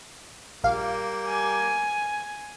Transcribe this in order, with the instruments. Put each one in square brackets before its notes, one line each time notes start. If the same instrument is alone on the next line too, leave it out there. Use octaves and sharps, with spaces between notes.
[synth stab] A#1 F5 [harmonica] G3 A#3
[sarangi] G#5